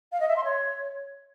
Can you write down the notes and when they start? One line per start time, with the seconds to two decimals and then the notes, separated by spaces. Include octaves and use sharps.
0.12 F5
0.20 D#5
0.28 E5
0.36 C6
0.44 C#5